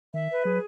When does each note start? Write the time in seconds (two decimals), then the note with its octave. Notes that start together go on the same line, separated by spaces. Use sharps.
0.14 D#3 E5
0.29 B4
0.45 F#3 G#4